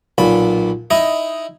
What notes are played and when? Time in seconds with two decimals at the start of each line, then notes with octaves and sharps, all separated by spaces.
0.18 B1 A#2 B5
0.90 D#4 E4 D#5